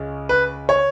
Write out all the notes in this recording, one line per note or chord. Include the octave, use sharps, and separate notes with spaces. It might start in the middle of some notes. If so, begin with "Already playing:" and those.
Already playing: C#2 C#3 G#3 C#4
B4
C#5